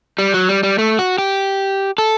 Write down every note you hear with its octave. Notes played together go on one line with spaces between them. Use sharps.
G3
F#3
G3
G3
A3
F#4
G4
A4